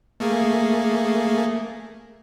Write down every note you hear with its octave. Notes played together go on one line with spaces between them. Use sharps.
A3 A#3 G#4